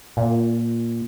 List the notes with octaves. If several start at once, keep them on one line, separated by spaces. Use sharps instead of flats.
A#2